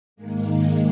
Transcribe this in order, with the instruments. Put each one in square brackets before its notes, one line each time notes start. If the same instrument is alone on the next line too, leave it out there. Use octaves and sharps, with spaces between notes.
[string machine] G#2 D#3 G#3 A#3